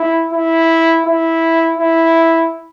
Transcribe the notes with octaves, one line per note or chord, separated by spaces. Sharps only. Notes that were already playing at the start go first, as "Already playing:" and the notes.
Already playing: E4
E4
E4
E4